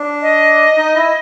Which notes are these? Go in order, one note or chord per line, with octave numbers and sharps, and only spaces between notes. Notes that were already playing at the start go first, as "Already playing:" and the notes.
Already playing: D4
D#5
D#4
E4